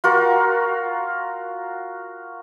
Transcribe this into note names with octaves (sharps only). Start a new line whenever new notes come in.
F4 F#4 A#4